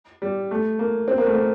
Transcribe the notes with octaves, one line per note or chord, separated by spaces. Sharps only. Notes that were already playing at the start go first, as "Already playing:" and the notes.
G3
A3
A#3
C4
A#3
A3
A#3